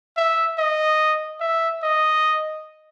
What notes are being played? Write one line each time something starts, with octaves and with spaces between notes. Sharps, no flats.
E5
D#5
E5
D#5